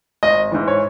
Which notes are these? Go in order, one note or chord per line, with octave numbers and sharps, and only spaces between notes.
G#1 D#5
G#2 E3
C#5